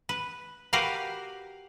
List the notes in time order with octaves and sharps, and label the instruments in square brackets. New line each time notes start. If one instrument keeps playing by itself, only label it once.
[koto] B4
F#4 G4 A#4 B4 F5